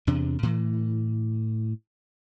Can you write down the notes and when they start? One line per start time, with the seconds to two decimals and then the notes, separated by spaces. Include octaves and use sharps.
0.07 E2 C3 D4
0.43 A2 E3